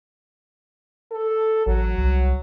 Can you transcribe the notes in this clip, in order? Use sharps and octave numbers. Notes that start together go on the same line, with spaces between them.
A4
A1 F#3
C2